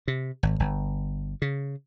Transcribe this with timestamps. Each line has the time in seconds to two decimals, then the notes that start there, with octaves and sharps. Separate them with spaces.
0.08 C3
0.43 G#1
0.60 G1
1.42 C#3